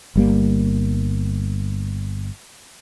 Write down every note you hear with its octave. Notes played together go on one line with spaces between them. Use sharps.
G1 G3 A#3